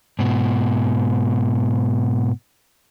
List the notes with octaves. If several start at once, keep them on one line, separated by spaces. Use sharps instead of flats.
G#2 B2